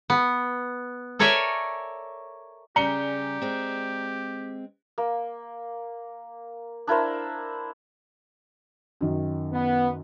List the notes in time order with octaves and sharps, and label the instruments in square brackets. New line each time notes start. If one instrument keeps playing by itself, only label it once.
[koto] B3
A4 A#4 C#5 D5 E5 G#5
[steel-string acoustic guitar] C#3 G3 G#4 [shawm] G4 [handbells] D5 [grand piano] A#5 C#7 G7
[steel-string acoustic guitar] G#3 C4
[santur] A#3
D4 E4 A#4 C5
[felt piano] F#2 D#3
[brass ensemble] B3